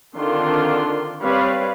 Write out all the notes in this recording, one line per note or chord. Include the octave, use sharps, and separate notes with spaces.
D3 D#3 C4 D4 F4 C6
G3 C4 B4 C#5 D5 F5